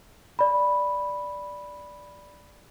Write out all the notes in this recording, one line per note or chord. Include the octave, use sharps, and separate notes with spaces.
D5 B5